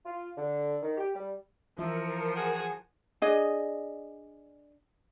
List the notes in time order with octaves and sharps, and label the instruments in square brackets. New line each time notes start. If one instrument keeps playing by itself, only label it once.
[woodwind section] F4
D3
D#3
G4
G3
[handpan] E3 F4 E5 [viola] F3 [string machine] A#4 C#7
[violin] F#4 G#4
[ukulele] D4 G#4 D#5